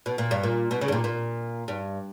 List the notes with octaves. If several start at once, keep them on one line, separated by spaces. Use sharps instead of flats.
B2
A#2
G2
A#2
B2
C#3
G2
A#2
A#2
G2